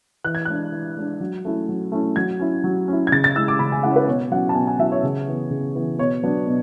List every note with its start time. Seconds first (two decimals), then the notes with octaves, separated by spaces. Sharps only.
0.24 E3 F#6
0.35 G#6
0.45 G#3 D4 F#6
0.72 E3
0.97 G#3 D4
1.20 F#3
1.45 A3 C#4 E4
1.69 F#3
1.92 A3 C#4 E4
2.16 F#3 G#6
2.40 C#4 E4
2.64 F#3
2.88 C#4 E4
3.07 G#6
3.12 C#3 A6
3.24 A6
3.36 G#3 C#4 E4 E6
3.48 D6
3.59 C#3 B5
3.72 G#5
3.83 G#3 C#4 E4 F#5
3.92 C#5
3.96 B4
4.08 B2 C#5
4.31 F#3 C#4 E4 F#5
4.49 A5
4.55 B2 G#5
4.67 G#5
4.79 F#3 C#4 E4 E5
4.92 C#5
5.03 C#3
5.27 E3 B3
5.50 C#3
5.75 E3 B3
5.98 B2 C#5
6.23 F#3 B3 D4
6.47 B2